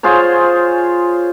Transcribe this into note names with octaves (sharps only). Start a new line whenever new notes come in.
F4 G#4 C5 C#5